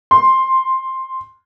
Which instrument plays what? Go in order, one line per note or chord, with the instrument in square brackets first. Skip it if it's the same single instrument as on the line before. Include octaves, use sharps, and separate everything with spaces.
[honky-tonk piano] C6